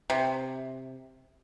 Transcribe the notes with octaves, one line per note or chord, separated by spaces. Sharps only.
C3